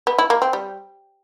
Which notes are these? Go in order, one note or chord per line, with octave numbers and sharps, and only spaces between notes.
B3
E4
A#3
C4
G3